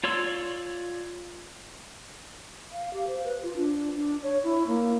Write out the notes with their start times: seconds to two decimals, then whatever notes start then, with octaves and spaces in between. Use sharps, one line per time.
0.04 F4 C#5 D5 C6 E6
2.72 F5
2.94 G4
3.07 C5
3.24 B4
3.43 F4
3.57 D4
3.96 D4
4.23 C#5
4.44 E4
4.67 A#3